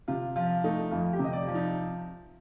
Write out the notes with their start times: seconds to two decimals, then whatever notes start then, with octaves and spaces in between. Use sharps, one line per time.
0.08 C3 F4
0.36 F3 F4
0.64 A3 D#4
0.91 F2 F4
1.13 G4
1.19 C3 D#5
1.33 D5
1.48 F3
1.55 D#4